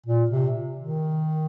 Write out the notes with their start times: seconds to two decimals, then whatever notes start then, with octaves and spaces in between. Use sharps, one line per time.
0.06 A#2
0.31 C3
0.79 D#3